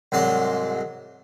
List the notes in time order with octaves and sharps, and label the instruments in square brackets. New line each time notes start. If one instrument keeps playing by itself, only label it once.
[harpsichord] C2 G#2 F#3 D5 A5 C6